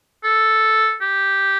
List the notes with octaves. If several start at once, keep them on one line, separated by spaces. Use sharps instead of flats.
A4
G4